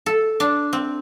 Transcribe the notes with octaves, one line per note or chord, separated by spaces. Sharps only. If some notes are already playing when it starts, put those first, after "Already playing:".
A4
D4
C4